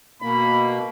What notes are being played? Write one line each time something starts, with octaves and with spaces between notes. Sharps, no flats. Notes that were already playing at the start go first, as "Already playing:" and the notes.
B2 A#3 B5